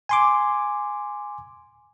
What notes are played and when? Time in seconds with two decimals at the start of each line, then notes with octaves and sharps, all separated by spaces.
0.09 G#5 C6 D6